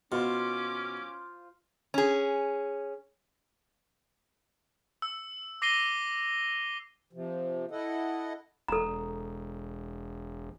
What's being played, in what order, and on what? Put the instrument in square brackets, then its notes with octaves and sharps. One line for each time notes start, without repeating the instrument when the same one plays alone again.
[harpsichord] B2 [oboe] C#4 [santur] F4 C5 [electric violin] D6
[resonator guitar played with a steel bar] C#4 G#4
[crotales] E6
D6 A#6 C7 D#7 G7
[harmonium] C3 F3
E4 A4 D#5 F#5
[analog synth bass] E1 [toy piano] A4 A#5